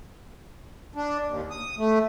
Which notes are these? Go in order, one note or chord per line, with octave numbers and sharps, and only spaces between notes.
D4
D#2
D#6
A3